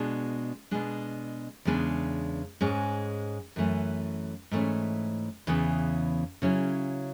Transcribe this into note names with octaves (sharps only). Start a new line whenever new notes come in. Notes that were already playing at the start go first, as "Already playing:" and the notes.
Already playing: B2 G#3 B3 D4
B2 G#3 D4
E2 C#3 G#3 B3 D4
G#2 G#3 C#4
F#2 E3 A3 C#4
G#2 E3 A3 C#4
E2 C#3 E3 B3
C#3 F#3 C#4 E4